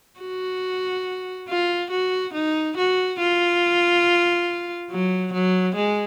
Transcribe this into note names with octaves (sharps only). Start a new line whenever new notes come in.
F#4
F4
F#4
D#4
F#4
F4
F#3
F#3
G#3